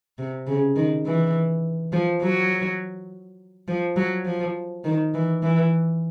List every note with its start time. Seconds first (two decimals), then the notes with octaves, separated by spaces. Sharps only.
0.18 C3
0.47 C#3
0.76 D#3
1.06 E3
1.92 F3
2.22 F#3
3.68 F3
3.96 F#3
4.25 F3
4.84 D#3
5.14 E3
5.43 E3